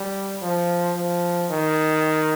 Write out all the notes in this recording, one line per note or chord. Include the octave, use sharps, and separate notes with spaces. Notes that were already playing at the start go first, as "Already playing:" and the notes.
Already playing: G3
F3
F3
D#3